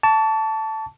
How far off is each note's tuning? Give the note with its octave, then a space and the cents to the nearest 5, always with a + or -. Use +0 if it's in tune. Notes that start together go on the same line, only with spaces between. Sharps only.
A5 +0 C#6 +45